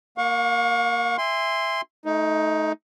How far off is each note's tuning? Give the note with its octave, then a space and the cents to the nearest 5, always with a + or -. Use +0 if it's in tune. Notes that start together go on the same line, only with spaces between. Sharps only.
A#3 +0 F5 +40 C#6 +0
E5 +0 G#5 -35 C6 -5
A3 -25 D#4 +15